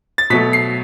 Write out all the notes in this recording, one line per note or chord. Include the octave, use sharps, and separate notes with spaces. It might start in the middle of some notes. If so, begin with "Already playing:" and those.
A6
B2 F#3 A3 B6
C7